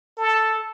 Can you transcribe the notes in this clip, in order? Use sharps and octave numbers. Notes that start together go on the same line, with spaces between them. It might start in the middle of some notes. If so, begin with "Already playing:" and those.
A4